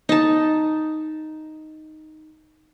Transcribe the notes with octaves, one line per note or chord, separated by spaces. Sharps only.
D#4 A5